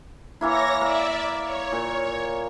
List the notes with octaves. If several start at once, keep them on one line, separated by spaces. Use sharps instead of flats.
E3 A#3 E4 C#5 A#6
A#3 D5 E5
C#5
A#2